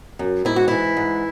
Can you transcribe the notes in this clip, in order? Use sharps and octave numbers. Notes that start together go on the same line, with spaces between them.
F#2
G#2 E4
F#4
E3 E4
G#2